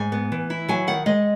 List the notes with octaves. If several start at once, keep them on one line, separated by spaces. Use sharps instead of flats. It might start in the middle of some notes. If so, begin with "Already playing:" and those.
Already playing: G#2 G#5
B3
E3
E4
F#3 G#5
D#3 F#5
G#3 D#5